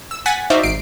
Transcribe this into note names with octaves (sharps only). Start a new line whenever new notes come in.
E6
F#5 G#5 A6 B6
D#4 F#4 C5 D5 E5 F5
G#1 C7 D7